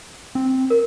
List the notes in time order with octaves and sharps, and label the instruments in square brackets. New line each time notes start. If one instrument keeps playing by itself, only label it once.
[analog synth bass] C4
[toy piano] A#4